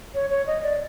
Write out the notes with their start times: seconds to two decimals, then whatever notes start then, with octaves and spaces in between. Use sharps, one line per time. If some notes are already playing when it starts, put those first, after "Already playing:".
0.14 C#5
0.30 C#5
0.46 D#5
0.63 D5